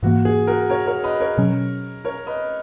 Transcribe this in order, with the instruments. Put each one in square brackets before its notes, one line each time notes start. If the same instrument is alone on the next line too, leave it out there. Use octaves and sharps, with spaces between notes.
[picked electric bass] G#2 E3 A#3 [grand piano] F#4
[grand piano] G#4
F#4 A#4
A#4 C#5
A#4 C#5
B4 D#5
A#4 C#5
[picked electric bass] B2 F#3 C#4
[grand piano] A#4 C#5
B4 D#5